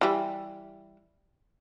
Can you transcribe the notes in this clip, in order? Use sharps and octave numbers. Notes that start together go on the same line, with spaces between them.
E3 G3